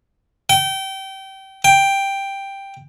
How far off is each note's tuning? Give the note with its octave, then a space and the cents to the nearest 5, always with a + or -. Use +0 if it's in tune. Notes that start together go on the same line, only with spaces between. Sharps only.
G5 -25
G5 +5